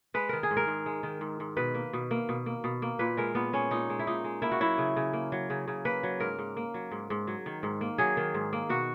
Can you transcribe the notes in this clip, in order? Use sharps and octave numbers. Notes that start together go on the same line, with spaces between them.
G#3 B4
D#3 A#4
G#4
G#2
A#4
G#2
G#3
D#3
G#2
G#2
B2 B4
A#3
B2
A#3
B2
A#3
B2
A#3
A#2 B4
G#3 A#4
A#2 B3
G#3 C#4
A#2 D#4
G#3
E4
A#2 D#4
G#3
A#3 E4
F#4
F#3 E4
C#3
C#3
A#3
F#3
C#3
C#3
A#3 B4
F#3
G#2 A#4
G#2
A#3
F#3
G#2
G#2
F#3
D#3
G#2
A#3
F#3 G#4
D#3
G#2
A#3
B2 F#4